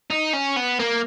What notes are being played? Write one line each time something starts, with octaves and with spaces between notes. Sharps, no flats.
D#4
C#4
B3
A#3